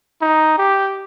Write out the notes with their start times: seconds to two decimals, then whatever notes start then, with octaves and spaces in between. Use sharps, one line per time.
0.21 D#4
0.58 G4